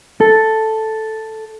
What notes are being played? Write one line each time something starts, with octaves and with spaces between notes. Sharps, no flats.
A4